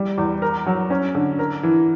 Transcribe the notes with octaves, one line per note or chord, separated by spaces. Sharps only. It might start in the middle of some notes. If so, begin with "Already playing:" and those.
Already playing: G3
E2
A#4
F#3
C#4
D3
A#4
E3